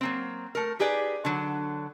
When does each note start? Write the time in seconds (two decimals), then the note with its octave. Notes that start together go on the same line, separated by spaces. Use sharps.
0.01 F#3 A#3 C4
0.55 A3 A#4
0.79 D#4 G4 G#4 B4 D5
1.25 D3 F#3